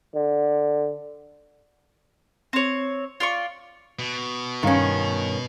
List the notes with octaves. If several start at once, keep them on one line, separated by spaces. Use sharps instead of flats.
D3
C4 C#5
F4 D5 C#6
B2
G2 D#3 C#4 C#5 F5